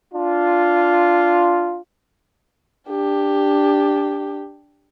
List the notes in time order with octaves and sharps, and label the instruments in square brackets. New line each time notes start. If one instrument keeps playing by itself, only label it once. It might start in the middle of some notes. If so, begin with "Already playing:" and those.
[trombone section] D4 F4
[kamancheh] D4 G4